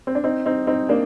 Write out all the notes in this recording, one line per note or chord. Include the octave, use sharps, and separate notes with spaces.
C4
D4
C4 D#4
C4 D#4
C4 D#4
A#3 D4